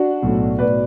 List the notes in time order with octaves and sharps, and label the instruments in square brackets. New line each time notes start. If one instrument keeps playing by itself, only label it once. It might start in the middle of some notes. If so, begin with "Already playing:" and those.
Already playing: [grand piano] D4 F#4
B1 A2 F#3 A3
B1 A2 F#3 B4 D5